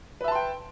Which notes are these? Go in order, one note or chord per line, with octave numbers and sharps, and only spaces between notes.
B4 E5 G5 A5 C6